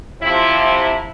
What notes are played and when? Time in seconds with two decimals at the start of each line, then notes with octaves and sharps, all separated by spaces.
0.20 C3 F3 E4
0.58 E4